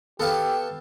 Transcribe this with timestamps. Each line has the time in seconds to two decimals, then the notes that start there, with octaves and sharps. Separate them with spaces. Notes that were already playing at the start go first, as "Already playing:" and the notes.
0.20 B3 G4 A4 F5 A5